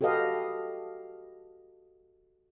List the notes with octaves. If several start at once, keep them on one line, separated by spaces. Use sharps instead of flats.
F#4 G4 A4 B4 D#5 F5